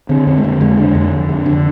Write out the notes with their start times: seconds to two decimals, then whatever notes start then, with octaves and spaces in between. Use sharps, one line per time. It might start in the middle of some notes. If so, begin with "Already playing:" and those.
0.09 D3 C4
0.27 F2 C4
0.38 G#3
0.44 D3 A#3
0.61 F2 G#3
0.77 D3 D4
0.95 F2
1.11 D3
1.29 F2
1.46 D3